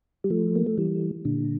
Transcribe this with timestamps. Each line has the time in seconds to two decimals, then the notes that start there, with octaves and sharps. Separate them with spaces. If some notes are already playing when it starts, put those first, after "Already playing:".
0.24 G3
0.30 F3 A3
0.56 A#3
0.67 A3
0.78 E3 G3
1.25 A#2 D3